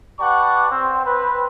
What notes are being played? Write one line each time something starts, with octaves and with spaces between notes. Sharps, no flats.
G4 B4 D5 F#5 A5 C#6
C4
C4 B4 C5